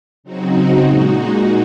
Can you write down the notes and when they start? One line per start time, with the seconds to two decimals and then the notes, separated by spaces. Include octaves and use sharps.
0.23 C#3 F#3 C4 D#4 F#4
0.85 A#2 G#3 D#4 F#4